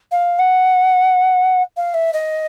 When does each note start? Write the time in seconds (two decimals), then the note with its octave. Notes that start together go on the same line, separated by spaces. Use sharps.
0.11 F5
0.39 F#5
1.77 F5
1.94 E5
2.13 D#5